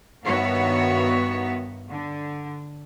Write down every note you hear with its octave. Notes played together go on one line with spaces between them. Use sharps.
G2 D#3 B3 F#4 C#5 E5
D3